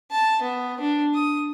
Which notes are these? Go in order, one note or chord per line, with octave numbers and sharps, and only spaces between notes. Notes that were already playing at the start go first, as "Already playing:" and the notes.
A5
B3
D4
D#6